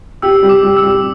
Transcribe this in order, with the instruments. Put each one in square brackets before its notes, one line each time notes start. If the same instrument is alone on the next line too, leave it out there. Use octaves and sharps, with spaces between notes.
[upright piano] G4 [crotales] E6
[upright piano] G3
[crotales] D6
[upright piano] G3
[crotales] E6
[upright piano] G3